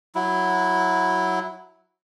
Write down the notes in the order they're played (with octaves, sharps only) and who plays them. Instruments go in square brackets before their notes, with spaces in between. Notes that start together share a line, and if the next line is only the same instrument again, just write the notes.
[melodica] F#3 E4